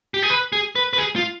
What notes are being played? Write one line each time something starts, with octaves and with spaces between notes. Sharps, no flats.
G4
G#4
B4
G#4
B4
B4
G#4
F4